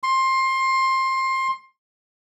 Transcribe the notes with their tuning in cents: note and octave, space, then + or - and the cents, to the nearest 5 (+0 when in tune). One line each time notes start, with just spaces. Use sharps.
C6 +20